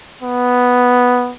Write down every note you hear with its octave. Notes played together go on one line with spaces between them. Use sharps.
B3